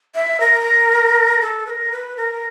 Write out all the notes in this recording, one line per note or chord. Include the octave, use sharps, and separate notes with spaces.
E5
A#4
A4
B4
A#4
B4
A#4